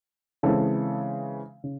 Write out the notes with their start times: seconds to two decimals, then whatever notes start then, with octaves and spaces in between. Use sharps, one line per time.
0.43 C#3 E3 G#3 C4 A4
1.64 C#3